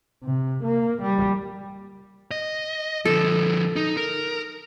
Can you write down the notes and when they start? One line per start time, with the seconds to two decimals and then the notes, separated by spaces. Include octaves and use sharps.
0.24 C3
0.63 A#3
1.02 G3
2.31 D#5
3.06 D3 F3 A4
3.76 D#4
3.97 A#4